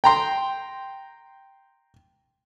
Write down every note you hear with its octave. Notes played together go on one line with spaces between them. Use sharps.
G5 A#5 C6